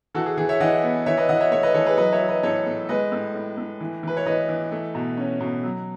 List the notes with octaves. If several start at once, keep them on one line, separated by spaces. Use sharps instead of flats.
E3 F#4 A4
G#4
E3 G#4
C#5 E5
E3 D#5 F#5
B3
E3 C#5 E5
B4 D#5
E3 D#5 F#5
C#5 E5
A3 C#5 E5
B4 D#5
E3 A4 C#5
G#4 B4
F#3 B4 D#5
C#5 E5
F#3
B4 D#5
A2 A4 C#5
A2
G#3 B4 D#5
A2
A2
A2
E3
E3 B4
C#5
E3 B4 D#5
E3
A3
B2
C#4
B2
F#3